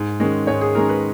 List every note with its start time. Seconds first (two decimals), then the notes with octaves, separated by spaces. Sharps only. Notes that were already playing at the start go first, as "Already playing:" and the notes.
Already playing: G#2
0.20 D#3 G#3 C#4
0.47 G#2 C#5
0.61 G#4
0.75 D#3 G#3 C#4 A#4
0.89 B4